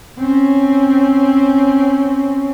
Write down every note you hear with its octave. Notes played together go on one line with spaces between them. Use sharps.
C4 C#4